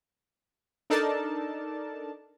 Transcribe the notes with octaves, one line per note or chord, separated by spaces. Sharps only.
D4 D#4 A4 A#4 D5 A5